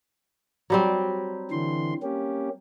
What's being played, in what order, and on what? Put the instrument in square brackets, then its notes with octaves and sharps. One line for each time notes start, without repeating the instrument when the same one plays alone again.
[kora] F#3 G3 C4
[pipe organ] D3 E3 C6
A#3 C#4 G4